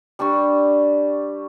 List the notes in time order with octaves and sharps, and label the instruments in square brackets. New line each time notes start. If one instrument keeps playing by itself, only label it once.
[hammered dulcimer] G3 D4 B4 C#6